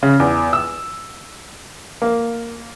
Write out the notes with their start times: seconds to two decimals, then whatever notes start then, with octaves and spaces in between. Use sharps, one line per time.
0.03 C#3
0.20 E2
0.53 E6
2.02 A#3